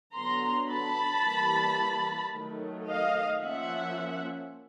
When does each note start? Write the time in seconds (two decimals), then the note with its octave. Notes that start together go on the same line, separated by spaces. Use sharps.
0.15 D3 F#3 B3 A#5 C6
0.70 A5 B5
1.24 E3 G3 A#3
2.33 D#3 F#3 A3
2.87 D#5 F5
3.41 F3 A#3 C#4 E5 F#5